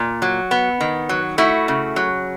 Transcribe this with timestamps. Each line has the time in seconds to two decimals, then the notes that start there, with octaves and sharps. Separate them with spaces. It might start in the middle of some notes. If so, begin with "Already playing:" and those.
Already playing: A#2
0.22 F#3
0.51 B3
0.81 D#3
1.09 F#3
1.38 A3 E4 F#4
1.68 C#3
1.96 F#3